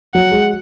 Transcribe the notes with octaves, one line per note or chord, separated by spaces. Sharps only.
F#3 F#5
G#3